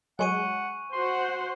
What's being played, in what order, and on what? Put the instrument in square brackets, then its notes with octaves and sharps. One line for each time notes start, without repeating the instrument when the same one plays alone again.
[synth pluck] F#3 G#3 G#4 [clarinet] F#5 [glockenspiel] G#5 C#6 D#7
[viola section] F#4 C5 F#5 [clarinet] C6